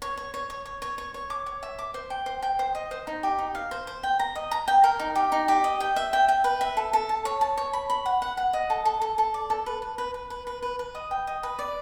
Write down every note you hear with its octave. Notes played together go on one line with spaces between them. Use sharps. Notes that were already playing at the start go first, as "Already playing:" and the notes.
C#5
C#5
C#5
C#5
C#5
C#5
C#5
C#5
D6
C#5
E5
D6
C5
G5
C5
G5
C5
D#5
C5
D#4
G4
D#4
F5
C5
C5
G5
A#5
D#5
A#5
G5
A#4
D#4
G4
D#4
G4
D#5
G5
E5
G5
G5
B4
E5
A4
A4
A5
C#5
A5
C#5
B5
B5
F#5
F#5
F#5
D#5
A4
A4
A4
A4
D5
A4
B4
B4
B4
B4
B4
B4
B4
B4
D#5
G5
D#5
B4
D5